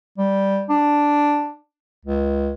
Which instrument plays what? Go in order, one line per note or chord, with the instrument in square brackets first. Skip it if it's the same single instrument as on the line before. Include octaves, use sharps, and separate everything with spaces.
[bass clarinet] G3
D4
C#2